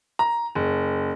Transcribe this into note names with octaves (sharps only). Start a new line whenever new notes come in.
A#5
F#1